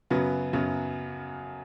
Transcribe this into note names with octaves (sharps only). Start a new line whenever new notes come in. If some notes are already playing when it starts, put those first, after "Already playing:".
F#2 C#3 F#3 B3 B4
F#2 C#3 F#3 B3